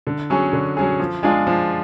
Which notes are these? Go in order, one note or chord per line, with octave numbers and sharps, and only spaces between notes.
D3
F#3 C#4 G#4
D3
F#3 C#4 G#4
F3
G#3 D4 F4 G#4
F3